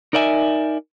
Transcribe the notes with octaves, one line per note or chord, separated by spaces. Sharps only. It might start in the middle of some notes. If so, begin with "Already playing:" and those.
D#4 A#4 D5 E5 G5 G#5